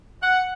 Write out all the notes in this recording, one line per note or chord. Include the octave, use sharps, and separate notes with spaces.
F#5